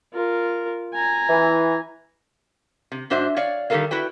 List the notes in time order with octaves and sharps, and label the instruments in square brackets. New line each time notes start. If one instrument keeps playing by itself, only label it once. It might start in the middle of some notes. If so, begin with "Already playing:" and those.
[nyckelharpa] F4 A#4
G#5 A#5
[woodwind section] E3
[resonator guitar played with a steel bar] C3
G#2 D4 F#4 C5 E5
C#5 D5 F5
D#3 G3 F4 A4 A#4 F5
E4 F#4 B4 G5